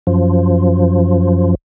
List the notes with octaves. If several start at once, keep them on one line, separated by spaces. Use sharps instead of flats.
F#2 F3